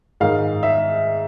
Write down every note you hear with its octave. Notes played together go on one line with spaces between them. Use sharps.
G#2 D#3 F5
E5